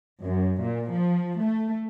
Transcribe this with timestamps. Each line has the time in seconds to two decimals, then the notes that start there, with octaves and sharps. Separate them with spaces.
0.22 F#2
0.62 A#2
0.91 F3
1.42 A3